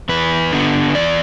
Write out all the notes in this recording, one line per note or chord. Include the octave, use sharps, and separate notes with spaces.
E2 B4
D3 B3
E2 D5